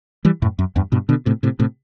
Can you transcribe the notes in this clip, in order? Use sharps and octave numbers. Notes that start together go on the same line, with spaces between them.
E3 G3
F#2 A2
F#2
E2 G2
G2 B2
B2 D3
A2 C3
A2 C3
A2 C3